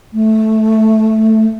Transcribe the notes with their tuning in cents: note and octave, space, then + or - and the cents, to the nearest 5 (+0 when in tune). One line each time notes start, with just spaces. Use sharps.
A3 -5